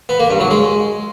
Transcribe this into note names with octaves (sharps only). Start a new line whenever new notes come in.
B3
A#3
G2
F#3
G#3